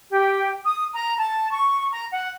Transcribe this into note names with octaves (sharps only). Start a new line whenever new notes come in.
G4
D#6
A#5
A5
C#6
A#5
F#5